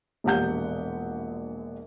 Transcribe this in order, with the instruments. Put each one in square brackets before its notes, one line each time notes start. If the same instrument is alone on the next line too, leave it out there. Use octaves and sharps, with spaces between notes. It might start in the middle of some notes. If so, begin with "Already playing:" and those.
[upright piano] E1 A#1 G4 F#5 G6